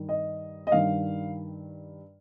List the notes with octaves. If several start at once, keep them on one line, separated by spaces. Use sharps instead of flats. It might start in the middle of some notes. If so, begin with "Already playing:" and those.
Already playing: G2 D#3
D#5
D#5
G2 D#3 F5